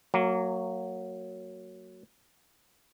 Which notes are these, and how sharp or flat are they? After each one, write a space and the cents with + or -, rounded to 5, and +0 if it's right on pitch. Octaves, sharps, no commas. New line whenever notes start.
F#3 +0 A#3 -25